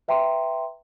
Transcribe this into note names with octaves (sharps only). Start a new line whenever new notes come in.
B4 E5 G5 A#5 C6